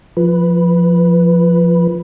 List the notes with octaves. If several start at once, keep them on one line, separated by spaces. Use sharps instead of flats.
F3 B4